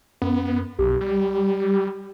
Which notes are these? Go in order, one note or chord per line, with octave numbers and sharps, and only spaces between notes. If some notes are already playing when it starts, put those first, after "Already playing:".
F#2 B3
B1 G4
G3